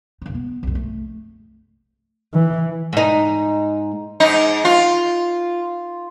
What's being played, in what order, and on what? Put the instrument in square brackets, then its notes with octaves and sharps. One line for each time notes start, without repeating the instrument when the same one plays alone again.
[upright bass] F1 C#3
B3
C2 G2
A3
[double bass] E3
[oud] G#2 D#4
[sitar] G#2 D#4
F4